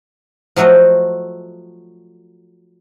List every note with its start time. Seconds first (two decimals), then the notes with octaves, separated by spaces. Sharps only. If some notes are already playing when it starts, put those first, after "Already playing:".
0.56 F3 F#3 A3 F#4 D#5